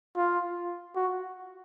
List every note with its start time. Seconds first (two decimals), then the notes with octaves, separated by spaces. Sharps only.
0.16 F4
0.95 F#4